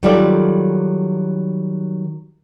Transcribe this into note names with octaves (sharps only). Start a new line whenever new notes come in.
D#3 F#3 G3 F4 A4 D5